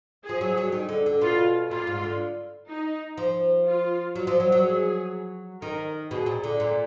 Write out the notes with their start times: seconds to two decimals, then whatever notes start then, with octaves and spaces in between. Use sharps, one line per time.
0.24 G#4
0.29 F3
0.41 F#3
0.57 F#3
0.72 D#3
0.89 D3
1.06 D3
1.21 B2 F4
1.70 A#2 F4
1.87 G#2
2.03 D3
2.68 D#4
3.18 F3
3.66 F4
4.15 F#3
4.27 F3
4.40 F#3
4.52 F#3
4.64 G#4
5.61 D#3 A#4
6.10 B2 G#4
6.26 A#2
6.44 D3
6.60 A#2